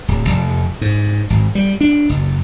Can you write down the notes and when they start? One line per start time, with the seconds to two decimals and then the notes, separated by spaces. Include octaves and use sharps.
0.08 D1
0.28 F1
0.81 G#2
1.30 G#1
1.55 G3
1.81 D4
2.09 F#1